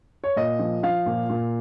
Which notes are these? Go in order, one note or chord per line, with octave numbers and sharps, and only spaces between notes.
C#5
A#2 D#5
F3
F3 F5
A#2
A#2